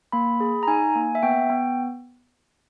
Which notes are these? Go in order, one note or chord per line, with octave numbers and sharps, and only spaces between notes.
A#3 B5
G#4
A#5
D#4 G#5
A#3
E5
B3 G5
B3